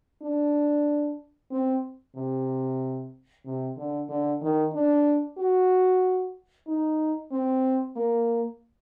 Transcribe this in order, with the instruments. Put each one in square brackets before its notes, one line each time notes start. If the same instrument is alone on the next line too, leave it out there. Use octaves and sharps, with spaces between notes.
[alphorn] D4
C4
C3
C3
D3
D3
D#3
D4
F#4
D#4
C4
A#3